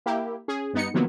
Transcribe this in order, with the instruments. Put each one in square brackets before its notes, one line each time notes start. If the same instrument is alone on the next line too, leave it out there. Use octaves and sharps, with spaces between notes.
[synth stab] A#3 E4 G4
C#4 G#4
G2 B3 D#4 C#7
C3 D#3 F3 F#3 A#3 B3